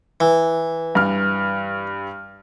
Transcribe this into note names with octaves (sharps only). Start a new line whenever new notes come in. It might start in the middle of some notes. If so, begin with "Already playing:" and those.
E3
G2 F6